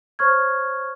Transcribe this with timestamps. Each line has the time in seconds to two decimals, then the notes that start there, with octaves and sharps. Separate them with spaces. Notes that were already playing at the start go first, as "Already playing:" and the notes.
0.19 C5 C#5 C#6 F6 G#6